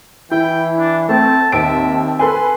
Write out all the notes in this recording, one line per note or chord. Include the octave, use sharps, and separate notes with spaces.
E3 E4 G5
D4
A3 C4 A5
D#2 C4 E5 A5 D7
A4 B4 G#5 C6